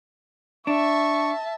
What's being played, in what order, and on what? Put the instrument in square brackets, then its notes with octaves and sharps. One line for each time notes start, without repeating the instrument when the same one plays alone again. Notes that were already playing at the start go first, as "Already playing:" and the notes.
[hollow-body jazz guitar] D4 [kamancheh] E5 A5 [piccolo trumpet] C#6